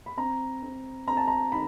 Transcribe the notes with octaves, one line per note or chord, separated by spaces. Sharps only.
B5
C4 A#5
C4
C4 A#5
A5
A#5
D#3 B5